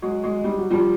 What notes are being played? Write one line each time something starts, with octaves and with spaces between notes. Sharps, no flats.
F#3 G#3
F#3 G#3
G3
F#3
F3 G3